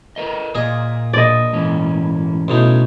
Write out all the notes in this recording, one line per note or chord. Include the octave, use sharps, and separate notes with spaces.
A#4 B4 D#5
A#2 A#3 G#4 D#5
A#1 D5 D#5
G#2 E3 C#4
B1 A2 C#3 D#4